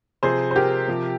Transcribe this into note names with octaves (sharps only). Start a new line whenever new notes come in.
C3 F3 G#4 C5
C5
G4 A#4
C3 F3